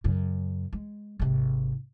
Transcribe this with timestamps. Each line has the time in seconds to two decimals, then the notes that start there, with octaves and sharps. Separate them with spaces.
0.04 F#2 C#3
0.73 G#3
1.19 G#1 C3